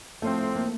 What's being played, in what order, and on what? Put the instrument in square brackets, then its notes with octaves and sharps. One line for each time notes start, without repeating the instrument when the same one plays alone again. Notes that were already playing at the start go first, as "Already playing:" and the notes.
[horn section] A2 F3 C4 [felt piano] A3
[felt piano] A#3